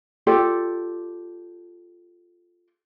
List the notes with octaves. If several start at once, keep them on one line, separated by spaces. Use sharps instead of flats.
F4 G4 A4 D5